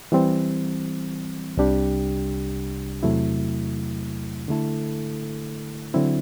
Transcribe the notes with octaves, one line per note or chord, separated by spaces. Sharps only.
E3 G3 C4
C2 C3 G3 D4 G4
E2 C3 F#3 A3 E4
D3 A3 E4 A4
D3 F#3 C4 E4